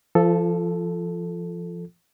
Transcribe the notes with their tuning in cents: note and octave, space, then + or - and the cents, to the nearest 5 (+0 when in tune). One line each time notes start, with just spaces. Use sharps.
F3 -30 F4 +0 A4 +0